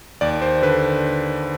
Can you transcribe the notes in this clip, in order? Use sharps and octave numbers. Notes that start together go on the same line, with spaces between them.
D#2 D5
C5
D3 B4